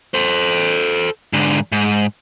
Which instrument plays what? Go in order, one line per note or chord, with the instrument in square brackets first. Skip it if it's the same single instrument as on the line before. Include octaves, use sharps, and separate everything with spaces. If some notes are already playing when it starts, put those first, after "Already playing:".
[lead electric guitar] A4 C5
G#2 D3
G#2